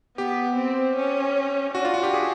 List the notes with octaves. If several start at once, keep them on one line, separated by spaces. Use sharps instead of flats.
B3 G4
C4
C#4
D4 F#4
F4
F#4
G4
G#4